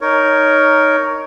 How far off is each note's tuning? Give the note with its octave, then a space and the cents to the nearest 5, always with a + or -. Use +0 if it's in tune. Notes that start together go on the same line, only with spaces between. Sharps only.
D#4 +0 A#4 +0 C#5 +10